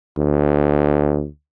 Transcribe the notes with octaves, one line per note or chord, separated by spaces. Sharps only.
D2